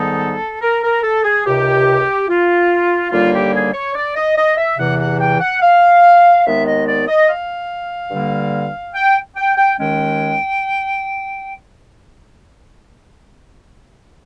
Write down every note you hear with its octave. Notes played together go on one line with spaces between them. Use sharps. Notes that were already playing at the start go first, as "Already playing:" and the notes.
Already playing: G#2 D#3 G3 B3 D#4 A4
A#4
A#4
A4
G#4
C#2 C3 D#3 G4
F4
D#2 D3 G3 A#3 F4
G4
G#4
C#5
D5
D#5
D#5
E5
E2 C3 E3 F#5
F#5
G5
F#5
F5
D#2 D#3 G#3 B3 E5
D#5
D5
D#5
F5
G2 D3 G3 A#3
G5
G5
G5
D#2 D#3 G#3 C#4 G5